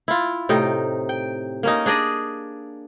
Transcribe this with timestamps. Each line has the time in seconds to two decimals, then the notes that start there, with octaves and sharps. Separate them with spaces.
0.08 E4 F4
0.49 A2 C3 D#4 G5
1.09 G5
1.63 A#3 C#4 D#4
1.86 D4 G#4 D5 D#5